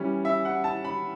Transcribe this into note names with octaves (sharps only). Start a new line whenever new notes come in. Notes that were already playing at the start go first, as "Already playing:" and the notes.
Already playing: E3 G3 C#4
E5
F#5
A5
B5